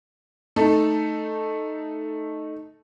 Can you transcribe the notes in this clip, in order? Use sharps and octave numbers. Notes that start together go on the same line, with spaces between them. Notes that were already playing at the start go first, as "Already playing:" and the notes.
A3 D#4 A4